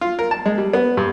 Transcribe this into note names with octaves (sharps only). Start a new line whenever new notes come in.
F4
A#4
A5
G#3
G3
B3
G2